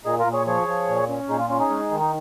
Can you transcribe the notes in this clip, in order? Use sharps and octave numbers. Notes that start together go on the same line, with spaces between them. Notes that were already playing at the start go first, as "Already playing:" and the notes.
A#2 D#4 G#4
F4 A#4
A#2
G#4 C#5
F3 G#4 C#5
F3
A#2
C#4
A#2 D#4 G#4
F4
C#4 F4
D#4 G#4
G#3
D#3
D#4